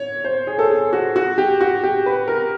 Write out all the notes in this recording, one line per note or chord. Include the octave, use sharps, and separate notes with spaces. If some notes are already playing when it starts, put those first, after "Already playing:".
Already playing: C#5
C5
G#4
A4
G#4
F#4
F#4
G4
F#4
G4
B4
A#4